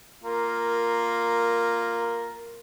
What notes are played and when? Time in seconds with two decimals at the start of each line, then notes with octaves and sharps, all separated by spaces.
0.24 A#3 F4 A#4